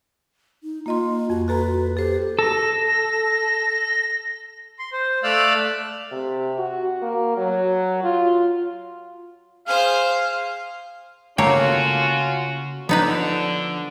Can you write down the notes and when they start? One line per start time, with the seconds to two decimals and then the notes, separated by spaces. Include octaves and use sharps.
0.63 D#4
0.86 A#3 F4 D#5 C6
1.30 F2 F#4
1.48 F#4 A4 B4 A#5
1.97 G4 A4 C5
2.39 A4 A#6
4.79 C6
4.93 C5
5.23 A3 D5 F5 E6 F#6
6.12 C3
6.58 F#4
7.02 A#3
7.37 F#3
8.04 F4
9.67 G#4 C5 F5
11.38 C#3 A3 A#3 C#4 F4 F#4 C#5 G5
12.89 D3 F3 B3 D#4 B4